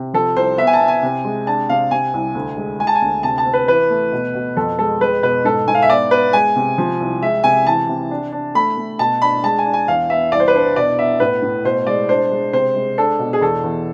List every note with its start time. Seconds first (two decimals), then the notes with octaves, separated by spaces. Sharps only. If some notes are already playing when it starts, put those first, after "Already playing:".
Already playing: C3
0.14 F3 A4
0.36 C2 C5
0.58 B3 E5
0.67 G#5
0.73 A5
0.80 B3
0.88 G#5
1.02 C3
1.25 G#3
1.46 D4 A5
1.69 C3 F5
1.91 C3 G#5
2.14 C2
2.35 D2
2.57 G#3
2.79 G#3 G#5
2.87 A5
2.95 G#5
3.02 D2
3.23 C3 A5
3.38 A5
3.46 C4
3.54 B4
3.68 E3 B4
3.90 A3
4.12 B2
4.34 B2
4.57 F2 A4
4.79 G#3 A4
5.01 G#3 B4
5.23 B2 B4
5.45 G#2 A4
5.67 G#2 G#5
5.75 F5
5.82 E5
5.90 B3 D5
6.11 B3 B4
6.33 G#3 G#5
6.56 C3
6.78 F3
7.01 C2
7.22 G#3 E5
7.44 C3 G#5
7.67 E3 A5
7.89 C3
8.11 D4
8.32 D4
8.55 A3 B5
8.77 A3
8.99 B2 A5
9.21 D4 B5
9.44 G#3 A5
9.58 G#5
9.65 D4
9.74 G#5
9.88 E2 F5
10.10 B3 E5
10.32 C2 D5
10.40 C5
10.48 B4
10.54 D4 C5
10.76 B2 D5
10.99 B3 E5
11.20 A2 B4
11.42 A2
11.64 B2 C5
11.87 G#3 D5
12.08 D4 C5
12.31 G#3
12.53 C3 C5
12.76 G#3
12.98 D4 A4
13.19 B2
13.33 G#4
13.41 E2 A4
13.64 E2